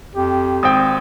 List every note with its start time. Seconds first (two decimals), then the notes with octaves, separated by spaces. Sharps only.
0.15 F2 G4
0.63 G#1 C4 G5 D#6